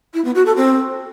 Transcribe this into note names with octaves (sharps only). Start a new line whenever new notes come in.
E4
B3
F#4
A4
C4